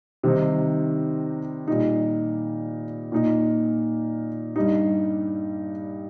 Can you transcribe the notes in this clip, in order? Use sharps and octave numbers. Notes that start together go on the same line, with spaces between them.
C3 D#3 G3 C4 D#4
A#2 G3 D#4
A#2 A#3 D#4
G2 G3 D#4